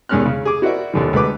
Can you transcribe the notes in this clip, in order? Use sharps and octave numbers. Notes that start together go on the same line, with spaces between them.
E2 D#3 G#3 C#4 F6 F#6
C#3
G#4 D6
E4 F#4 A#4 C5 D5 E5
D#2 D3 E3
D2 G#3 A3 B4 D6